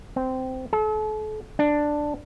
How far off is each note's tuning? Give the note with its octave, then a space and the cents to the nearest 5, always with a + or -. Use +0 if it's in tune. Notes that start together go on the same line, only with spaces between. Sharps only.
C4 -15
A4 -40
D4 +5